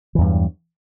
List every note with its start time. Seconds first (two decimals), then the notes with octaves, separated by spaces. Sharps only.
0.15 E3
0.18 E2
0.21 G2
0.24 F#3